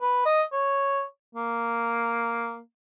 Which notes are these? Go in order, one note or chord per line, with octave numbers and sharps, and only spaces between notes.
B4
D#5
C#5
A#3